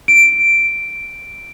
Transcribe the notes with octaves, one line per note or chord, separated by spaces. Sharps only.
D7